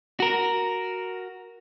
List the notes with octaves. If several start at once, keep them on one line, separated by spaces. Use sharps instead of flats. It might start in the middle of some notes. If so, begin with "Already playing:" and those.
F#4 A#4